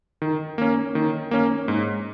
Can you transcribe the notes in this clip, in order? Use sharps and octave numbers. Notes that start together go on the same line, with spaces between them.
D#3
A#3 C#4
D#3
A#3 C#4
G#2